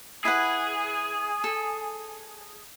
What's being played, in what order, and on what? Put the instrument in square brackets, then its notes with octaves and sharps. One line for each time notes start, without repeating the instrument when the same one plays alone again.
[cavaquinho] E4 B4 F#5 [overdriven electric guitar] G#4
[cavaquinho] A4